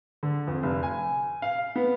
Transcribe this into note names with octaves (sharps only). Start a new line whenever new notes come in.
D3
F2
F1
G#5
F5
B3